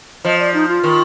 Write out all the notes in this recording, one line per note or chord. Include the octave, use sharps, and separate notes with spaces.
F3 D#5
D5
D#4
F4
D#3